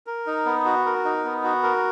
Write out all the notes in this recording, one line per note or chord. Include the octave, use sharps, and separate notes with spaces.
A#4
D#4
B3
F#4
A#4
D#4
B3
F#4
A#4